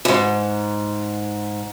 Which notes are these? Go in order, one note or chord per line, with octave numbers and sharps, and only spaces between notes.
E2 G#2